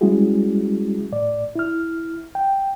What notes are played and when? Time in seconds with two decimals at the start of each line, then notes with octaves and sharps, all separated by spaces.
0.01 G3 G#3 C#4 E4 F#4 G#4
1.12 A2 D5
1.56 E4 F6
2.35 G5